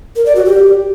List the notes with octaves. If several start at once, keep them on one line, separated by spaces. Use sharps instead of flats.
A#4
D5
F#4
G4